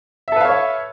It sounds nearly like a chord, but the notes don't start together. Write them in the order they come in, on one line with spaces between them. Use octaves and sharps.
E5 A4 B4 F5 C#5